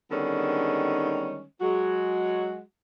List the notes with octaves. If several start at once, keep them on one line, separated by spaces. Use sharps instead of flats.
D3 D#3 G3 G#3 B3 C#4
F#3 G#3 F#4